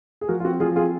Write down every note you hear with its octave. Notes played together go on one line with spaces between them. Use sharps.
G#4
F3 F#4 A#4
F4
C4 F#4
F3 F4 G#4
C4 F4 G#4